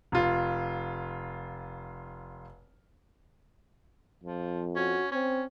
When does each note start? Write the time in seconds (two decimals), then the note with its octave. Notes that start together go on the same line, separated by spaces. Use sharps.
0.12 F1 F4
4.24 F2 F3
4.76 C#4 F#4
5.12 C4 C#4